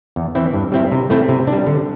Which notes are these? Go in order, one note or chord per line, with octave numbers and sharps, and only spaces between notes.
E2
E3 C4 E4
G2
G3 C4 E4
C3
A3 C4 E4
C3
D4
G3
D3